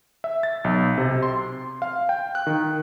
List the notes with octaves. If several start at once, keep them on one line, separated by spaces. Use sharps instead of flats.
E5
A6
B1
C3
C6
F5
G5
F#6
D#3